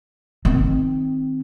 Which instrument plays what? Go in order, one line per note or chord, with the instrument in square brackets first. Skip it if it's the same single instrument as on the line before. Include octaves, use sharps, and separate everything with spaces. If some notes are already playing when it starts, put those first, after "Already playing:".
[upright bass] D#3 C4